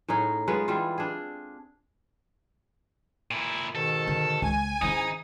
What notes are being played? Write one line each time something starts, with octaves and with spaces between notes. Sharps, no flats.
A2 C#4 D#4 G#4
G#3 B3 F4 B4
E3 G3 C4 F4
D4 G#4
A#2 E4
G#2 B2 D#3 A4
D3
C#2 G#5
G#2 D#3 C#4 D#4 E4 D#6